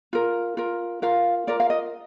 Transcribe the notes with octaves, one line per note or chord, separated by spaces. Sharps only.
F4 A#4
F4 A#4
F4 A#4 F5
F4 A#4 D5
F5
D#5